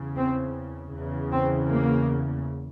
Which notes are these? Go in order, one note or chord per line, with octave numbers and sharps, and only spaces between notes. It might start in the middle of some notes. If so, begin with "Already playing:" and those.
Already playing: E2 C#3
C4
E2 C#3
C4
A#3